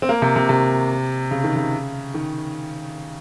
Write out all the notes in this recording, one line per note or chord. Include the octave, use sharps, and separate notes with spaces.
C4
A#3
C3
C3
C3
C#3
D#3
C#3
D#3